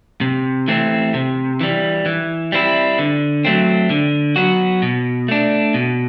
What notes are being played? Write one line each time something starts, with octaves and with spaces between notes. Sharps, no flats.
C3
E3 A3 C4
C3
E3 G3
E3
G3 C4 E4
D3
F#3 A3 C4
D3
F#3 B3 F#4
B2
A3 D4
B2